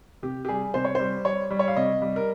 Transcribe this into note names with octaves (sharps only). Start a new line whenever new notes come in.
C3 G4
G4
G3 G#4
C3 C5
C#5
G3 C5
G3 C#5
G3
C#5
F5
C3 D#5
G3
A#4